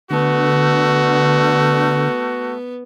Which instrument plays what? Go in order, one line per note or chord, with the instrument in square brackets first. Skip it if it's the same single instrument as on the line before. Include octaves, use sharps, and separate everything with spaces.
[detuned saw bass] D3 [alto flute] A3 [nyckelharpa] B3 [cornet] F#4